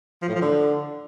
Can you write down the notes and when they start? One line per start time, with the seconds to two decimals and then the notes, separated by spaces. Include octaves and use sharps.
0.22 F3
0.28 A2
0.35 F3
0.41 D3